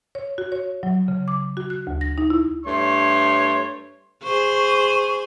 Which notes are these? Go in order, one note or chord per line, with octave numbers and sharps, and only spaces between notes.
C#5
F#4
C#5
F#3
C#3
D6
F#4
F#6
D2
A#6
D#4
E4
G2 A3 C#5 C6
G#4 C5 C#6